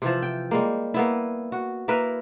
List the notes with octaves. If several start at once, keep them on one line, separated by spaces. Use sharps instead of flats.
C3 E3 F3
G5
G3 G#3 A#3
A#3 B3 E4
F#4
A#3 E4 A#4 B4